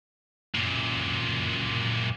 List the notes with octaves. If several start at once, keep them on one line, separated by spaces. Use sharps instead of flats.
F#2 A#2